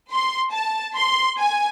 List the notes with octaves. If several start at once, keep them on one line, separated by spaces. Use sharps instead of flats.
C6
A5
C6
G#5